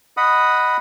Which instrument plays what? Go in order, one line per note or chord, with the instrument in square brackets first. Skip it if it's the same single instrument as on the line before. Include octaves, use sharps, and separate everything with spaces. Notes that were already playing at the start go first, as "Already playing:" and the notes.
[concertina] D#5 F#5 B5 D#6